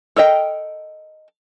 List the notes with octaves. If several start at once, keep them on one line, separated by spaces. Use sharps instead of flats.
A4 A#4 D#5 G5